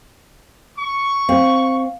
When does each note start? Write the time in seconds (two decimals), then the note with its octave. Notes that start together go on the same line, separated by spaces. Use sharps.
0.78 C#6
1.29 C4 F5